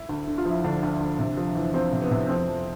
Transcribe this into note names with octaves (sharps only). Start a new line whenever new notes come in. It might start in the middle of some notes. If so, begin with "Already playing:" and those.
Already playing: E4
D2
D3
F4
F3
E4
D2 D3 D4
D2
D2
C3
F3
E2
F3 C4
C3
B3
C3
F2 C4
F2